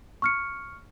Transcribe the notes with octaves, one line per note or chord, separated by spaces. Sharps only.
C#6 F6 C#7